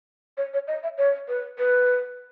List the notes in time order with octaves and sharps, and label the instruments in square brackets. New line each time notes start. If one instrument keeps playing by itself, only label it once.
[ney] C#5
C#5
D#5
E5
C#5
B4
B4